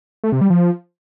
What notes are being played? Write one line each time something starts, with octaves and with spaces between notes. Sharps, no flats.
A3
C3
G3
F3